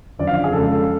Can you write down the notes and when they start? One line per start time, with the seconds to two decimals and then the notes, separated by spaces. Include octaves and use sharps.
0.19 F#2 D3 F3 D5
0.27 F5
0.44 G#4
0.52 F2 C#3 G#3 A4